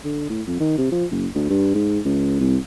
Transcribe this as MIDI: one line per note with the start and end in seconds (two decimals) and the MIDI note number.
0.04 0.26 50
0.30 0.42 45
0.47 0.58 41
0.60 0.76 51
0.78 0.89 48
0.92 1.05 53
1.11 1.27 30
1.35 1.49 38
1.49 1.74 43
1.75 1.99 44
2.05 2.36 37
2.40 2.57 36